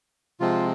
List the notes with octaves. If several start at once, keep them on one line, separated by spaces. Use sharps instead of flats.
C3 F3 G#3 C4 F4